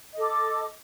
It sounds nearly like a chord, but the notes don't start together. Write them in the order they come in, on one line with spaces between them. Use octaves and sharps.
D#5 A4 D6